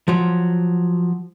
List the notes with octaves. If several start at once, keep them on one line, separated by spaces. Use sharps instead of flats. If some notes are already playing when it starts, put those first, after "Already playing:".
F3 F#3